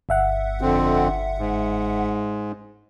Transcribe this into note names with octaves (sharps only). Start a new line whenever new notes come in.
G1 E5 F#5
F2 D3 C4
G#2